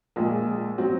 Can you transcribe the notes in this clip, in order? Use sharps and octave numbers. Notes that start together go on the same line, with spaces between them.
A#1 A#2 G#3
F#3 C4 F#4